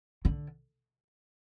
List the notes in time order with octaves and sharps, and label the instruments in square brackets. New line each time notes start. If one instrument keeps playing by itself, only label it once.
[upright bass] D3